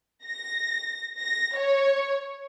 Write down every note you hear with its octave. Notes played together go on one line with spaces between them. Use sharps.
A#6
A#6
C#5